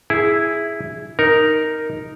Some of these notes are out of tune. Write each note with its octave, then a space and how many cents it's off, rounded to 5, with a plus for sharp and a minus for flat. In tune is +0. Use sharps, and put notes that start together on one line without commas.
E4 +0 G#4 +0
D#4 +0 A#4 +0